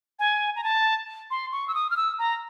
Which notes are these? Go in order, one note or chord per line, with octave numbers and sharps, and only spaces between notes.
G#5
A#5
A5
C6
C#6
E6
D#6
F6
E6
A#5